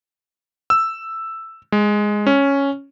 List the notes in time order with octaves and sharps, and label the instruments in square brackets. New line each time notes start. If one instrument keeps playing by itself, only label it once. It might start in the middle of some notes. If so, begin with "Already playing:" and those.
[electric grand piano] E6
G#3
C#4